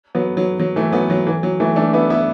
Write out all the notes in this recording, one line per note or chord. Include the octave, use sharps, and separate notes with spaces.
F#3 B3
F#3
F#3
E3 A3
F#3 B3
F#3
E3
F#3
E3 A3
A3 D4
B3 E4
B3 E4